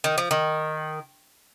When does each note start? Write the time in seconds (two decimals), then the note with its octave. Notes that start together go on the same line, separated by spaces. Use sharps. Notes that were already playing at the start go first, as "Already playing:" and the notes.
0.04 D#3
0.18 F3
0.31 D#3